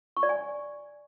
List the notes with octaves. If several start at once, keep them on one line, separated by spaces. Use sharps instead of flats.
C#6
D5
G#5